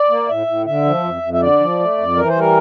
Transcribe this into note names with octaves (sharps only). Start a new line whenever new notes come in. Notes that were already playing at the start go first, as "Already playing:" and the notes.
Already playing: D5
A#3
A2 E5
A2
D3 E5
F3
F2
F2
E5
D3 D5
F3
A3
F2
E3 A#4
C5
G3 A#4